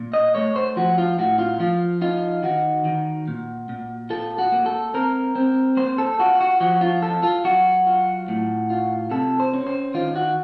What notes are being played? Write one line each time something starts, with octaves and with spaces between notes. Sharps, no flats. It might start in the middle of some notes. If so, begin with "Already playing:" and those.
Already playing: A#2
D#5
A3 C#5
C5
F3 F#4
F4
A2 F#4
F4
F3 F4
D#4 F4
D#3 F#4
D#3
A#2
A#2
F4 A4
F#4
A#3
A4
C4 A#4
C4
A#3 C5
A4
F4 F#4
F#4
F3 F#4
F4
F4 A4
F4
F#3 F#4
F4
A2
F4
C3 A4
C5
C#4
C5
D#3 F4
F#4